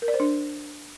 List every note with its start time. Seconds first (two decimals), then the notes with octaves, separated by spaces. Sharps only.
0.02 A#4
0.08 D5
0.14 C5
0.20 D4